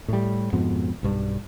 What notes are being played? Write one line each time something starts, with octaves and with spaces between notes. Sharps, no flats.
A2 G3
F2 G#2 B2 B3
B1 G2